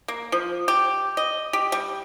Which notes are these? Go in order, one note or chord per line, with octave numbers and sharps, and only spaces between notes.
A#3
F3
G4
D#5
G4
G3